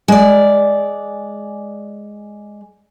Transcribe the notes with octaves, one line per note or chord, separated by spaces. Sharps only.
G#3 D5